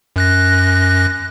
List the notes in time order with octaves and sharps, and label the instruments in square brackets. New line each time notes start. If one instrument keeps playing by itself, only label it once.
[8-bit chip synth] F#2 F#6 A#6